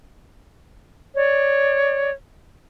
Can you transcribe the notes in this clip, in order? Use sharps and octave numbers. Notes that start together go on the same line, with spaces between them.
C#5 D5